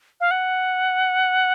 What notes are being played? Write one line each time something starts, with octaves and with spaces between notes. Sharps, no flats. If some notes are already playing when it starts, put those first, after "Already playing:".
F5
F#5